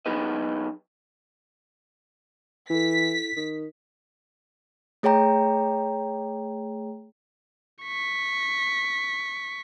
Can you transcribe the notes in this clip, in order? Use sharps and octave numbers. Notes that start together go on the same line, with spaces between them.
F#3 B3 D#4 G#4 B4 D#5
E3 E4 A4 B6
D#3
A3 G#4 C#5 G5 A#5
C#6 B6